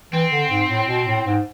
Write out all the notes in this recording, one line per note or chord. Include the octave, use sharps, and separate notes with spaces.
E3 C4
D3
G#2
A2
B2
A2
G#2